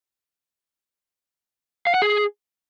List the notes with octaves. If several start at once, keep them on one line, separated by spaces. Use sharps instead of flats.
F5
F#5
G#4